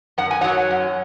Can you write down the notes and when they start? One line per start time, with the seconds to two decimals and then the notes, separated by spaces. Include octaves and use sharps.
0.18 F#2 F#5
0.31 G#5
0.41 F#3 C#5 F#5
0.71 F#2